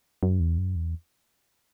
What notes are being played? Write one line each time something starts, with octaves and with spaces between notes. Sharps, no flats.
F#2
E2
F#2
E2